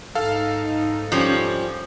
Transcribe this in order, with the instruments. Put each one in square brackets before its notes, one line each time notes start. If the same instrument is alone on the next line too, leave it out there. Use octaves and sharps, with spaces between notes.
[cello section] G#2 D#4 [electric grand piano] A4 F5
[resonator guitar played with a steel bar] F3 G3 C#4